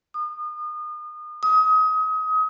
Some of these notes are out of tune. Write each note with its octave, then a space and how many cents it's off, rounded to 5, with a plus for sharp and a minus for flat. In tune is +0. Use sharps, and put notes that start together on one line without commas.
D#6 -35
D#6 +30